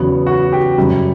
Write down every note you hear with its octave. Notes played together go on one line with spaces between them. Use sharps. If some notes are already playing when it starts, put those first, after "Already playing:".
Already playing: E2 C#3 F#3 B3
F#4
G4
F#2 C#3 G3